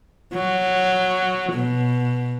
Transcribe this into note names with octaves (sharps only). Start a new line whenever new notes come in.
F#3
B2